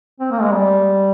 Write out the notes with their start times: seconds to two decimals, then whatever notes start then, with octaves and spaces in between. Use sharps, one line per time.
0.20 C4
0.31 A#3
0.41 G#3
0.52 G3